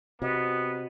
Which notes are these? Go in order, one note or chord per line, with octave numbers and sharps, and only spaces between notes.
C3 B3 F#4 D#5